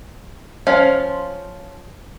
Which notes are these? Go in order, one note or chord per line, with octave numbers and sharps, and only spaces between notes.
F3 C#4 F4 F5